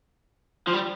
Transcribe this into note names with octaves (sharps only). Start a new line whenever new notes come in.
F3
G3